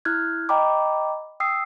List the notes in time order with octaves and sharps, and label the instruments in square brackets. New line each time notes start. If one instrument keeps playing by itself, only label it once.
[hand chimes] E4 F6 F#6 G#6
D#5 G5 A#5 B5 D6
G5 D#6 E6 C7